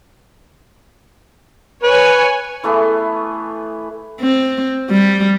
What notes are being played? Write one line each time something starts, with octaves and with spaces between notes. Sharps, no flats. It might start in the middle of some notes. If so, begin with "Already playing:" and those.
B4 C#5 G#5
E3 A3 B3 G#4
C4
G3